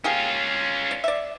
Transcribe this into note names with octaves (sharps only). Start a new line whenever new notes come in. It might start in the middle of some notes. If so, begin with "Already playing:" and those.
A#3 C#4 F4 G4 G#4
D5
D5 E5